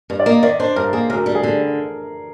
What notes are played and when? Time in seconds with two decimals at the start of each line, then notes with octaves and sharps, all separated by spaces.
0.10 G2
0.19 D5
0.26 A#3 D#5
0.43 D#3 D5
0.60 D4 C5
0.76 G2 A#4
0.93 A#3 G#4
1.10 D2 A#4
1.26 G3
1.35 G#4
1.43 D3